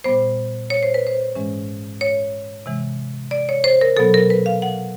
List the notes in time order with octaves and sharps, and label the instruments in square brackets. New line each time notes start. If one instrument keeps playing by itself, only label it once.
[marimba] A#2 G3 B3 C5
C#5
C5
B4
C5
G#2 E3 G#3 C#4
C#5
C3 E3 G#3
D5
C#5
C5
A#4
B2 F#3 B3 A4
A#4
B4
F5
F#5